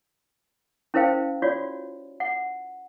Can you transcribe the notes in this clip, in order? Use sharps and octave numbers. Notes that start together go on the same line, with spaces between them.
C#4 E4 A#4 C5 F5 G5
F4 F#4 C#5 D5
F#5